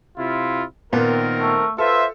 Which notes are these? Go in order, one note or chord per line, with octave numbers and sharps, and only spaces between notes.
C3 E4 F4
A#2 D#3 B3 C4 A#4
A3
F4 A4 B4 C5 E5